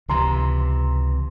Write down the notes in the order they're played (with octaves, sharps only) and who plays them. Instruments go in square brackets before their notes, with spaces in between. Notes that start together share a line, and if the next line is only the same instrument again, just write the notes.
[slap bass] C#2 C3 E3 [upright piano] A#5 C6